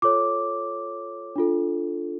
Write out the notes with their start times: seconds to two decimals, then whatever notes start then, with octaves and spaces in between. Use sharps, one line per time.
0.02 F4 A4 C#5 D6
1.36 D4 F4 A4